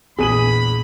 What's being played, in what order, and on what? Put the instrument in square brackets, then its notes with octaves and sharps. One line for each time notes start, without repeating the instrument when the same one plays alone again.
[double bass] A#1 [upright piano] E2 D#7 F#7 [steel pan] G#4 [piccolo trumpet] B5